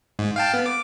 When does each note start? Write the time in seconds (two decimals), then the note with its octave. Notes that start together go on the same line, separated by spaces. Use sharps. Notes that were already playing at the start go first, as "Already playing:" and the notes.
0.19 G#2
0.36 F5 G5 A5
0.54 B3
0.66 D6